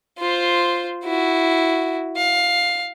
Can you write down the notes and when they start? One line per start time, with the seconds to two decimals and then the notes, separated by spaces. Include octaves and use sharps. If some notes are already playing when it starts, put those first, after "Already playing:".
0.19 F4 C5
1.05 E4 F#4
2.16 F5